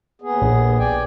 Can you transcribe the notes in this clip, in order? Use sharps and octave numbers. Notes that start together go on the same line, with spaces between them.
D#2 B3 G#4
A#1
D5 G5 G#5